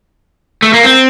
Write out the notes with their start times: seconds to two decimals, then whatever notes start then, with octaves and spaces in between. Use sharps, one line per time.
0.62 A3
0.73 A#3
0.83 C4